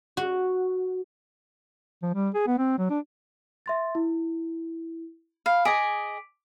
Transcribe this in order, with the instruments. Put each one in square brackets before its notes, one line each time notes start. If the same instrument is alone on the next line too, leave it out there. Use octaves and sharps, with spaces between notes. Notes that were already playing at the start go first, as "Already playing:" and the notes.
[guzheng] F#4
[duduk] F3
G3
G#4
B3
C4
F#3
D4
[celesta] E5 C6 A6
E4
[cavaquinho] F5 [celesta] B5
[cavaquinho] G#4 D#5 G#5 [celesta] D6 B6 D7